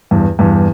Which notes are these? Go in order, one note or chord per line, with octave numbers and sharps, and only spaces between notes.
E2 G2
E2 G2